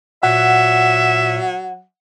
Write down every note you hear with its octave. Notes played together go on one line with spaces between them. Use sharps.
A#2 F#3 E5 F#5